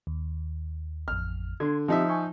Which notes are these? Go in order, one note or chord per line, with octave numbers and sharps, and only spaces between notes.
D#2
A1 F2 F6
D3 C6 G#6
F3 C4 D#4 G4 D#5 E5
G#5 C#6 G6